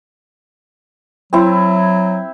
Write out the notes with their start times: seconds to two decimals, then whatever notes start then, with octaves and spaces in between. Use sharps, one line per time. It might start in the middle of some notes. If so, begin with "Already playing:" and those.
1.33 F#3 C4 E4